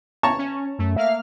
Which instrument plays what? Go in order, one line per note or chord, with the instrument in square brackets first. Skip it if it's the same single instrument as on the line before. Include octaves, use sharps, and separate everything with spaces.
[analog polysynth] C#5 [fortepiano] A5 A#5 C#6
[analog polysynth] C#4
[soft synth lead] F#2 [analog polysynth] A3
[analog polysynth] A#3 F5 F6 [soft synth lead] E5